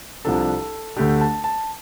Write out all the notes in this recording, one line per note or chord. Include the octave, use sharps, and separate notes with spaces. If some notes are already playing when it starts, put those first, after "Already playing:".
C2 C3 F3 D4 A4
D2 D3 A3 D4 G4
A5
A5